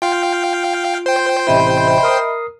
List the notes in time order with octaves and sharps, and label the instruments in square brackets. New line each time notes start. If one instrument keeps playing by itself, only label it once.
[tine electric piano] F4 [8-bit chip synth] F5 G5
[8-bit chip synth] C5 G5
[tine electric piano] A1 C3 E4 [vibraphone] D#5 E5 B5
[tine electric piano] A#4 D#6 C7